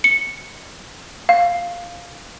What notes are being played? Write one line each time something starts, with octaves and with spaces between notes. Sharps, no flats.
C#7
F5